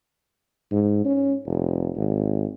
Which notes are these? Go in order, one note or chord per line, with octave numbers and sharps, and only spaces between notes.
G#2
C#4
F1
G#1